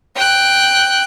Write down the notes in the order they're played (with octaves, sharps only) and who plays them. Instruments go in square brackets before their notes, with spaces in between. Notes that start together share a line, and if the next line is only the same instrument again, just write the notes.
[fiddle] G5 F#6